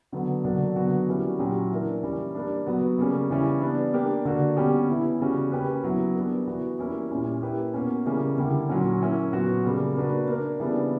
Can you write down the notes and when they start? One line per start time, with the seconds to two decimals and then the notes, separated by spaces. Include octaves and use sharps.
0.12 D3 F#3 B3
0.44 D3 F#3 A#3 D4
0.76 D3 F#3 B3 F#4
1.08 E3 G3 A#3 C#4 F#4
1.39 A#2 F#3 C#4 E4 G4
1.71 E3 A#3 D4 A#4
2.03 E3 G3 C#4
2.35 G3 A#3 D4
2.66 F#3 B3 F#4
2.98 C#3 G3 A#3 C#4
3.30 C#3 E3 G3 C#4
3.61 G3 B3 D4
3.93 A#3 D4 G4
4.25 D3 A#3 D4 F#4
4.57 B2 G3 C#4 G4
4.88 E3 B3 E4
5.20 C#3 G3 C#4 F#4
5.52 A#3 C#4 G4 B4
5.84 F#3 B3 E4
6.16 G3 B3 D4 A#4
6.47 E3 B3 F#4
6.79 G3 A#3 C#4 E4
7.10 A#2 G3 C#4 E4
7.43 A#3 E4 G4 B4
7.74 B2 A#3 C#4
8.06 C#3 E3 G3 A#3 C#4
8.38 D3 G3 A#3 E4 G4
8.69 A#2 F#3 C#4
9.01 A#3 C#4 E4
9.33 A#2 F#3 B3 F#4
9.64 C#3 G3 A#3
9.96 A#3 D4 F#4 B4
10.28 A#3 D4 A#4
10.60 C#3 E3 G3 B3 D4